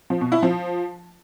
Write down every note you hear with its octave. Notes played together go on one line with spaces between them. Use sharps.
F3
B2
E4
F3